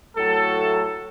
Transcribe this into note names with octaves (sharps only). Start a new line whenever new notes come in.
A2 F#3 A3 A4